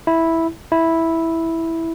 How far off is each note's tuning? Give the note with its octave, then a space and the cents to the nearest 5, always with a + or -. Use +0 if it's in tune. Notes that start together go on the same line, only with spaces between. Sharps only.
E4 -5
E4 -5